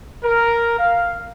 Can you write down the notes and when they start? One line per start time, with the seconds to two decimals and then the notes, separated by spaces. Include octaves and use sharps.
0.24 A#4
0.78 F5